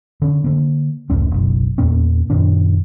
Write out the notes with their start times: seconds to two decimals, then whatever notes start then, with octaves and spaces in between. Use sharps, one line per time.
0.22 D3 C#4
0.44 D3 A#3
1.10 F1 C#2 A2 C#4
1.32 F#1 B1
1.78 E2 A#2 A#3 C#4
2.30 F#2 A#2 D#3 D4